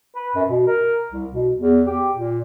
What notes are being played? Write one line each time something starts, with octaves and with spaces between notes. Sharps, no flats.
B4
F#2
B2
A#4
C2
B2
E2
G4
A#2